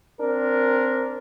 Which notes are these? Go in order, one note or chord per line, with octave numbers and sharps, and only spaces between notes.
C4 D4 A#4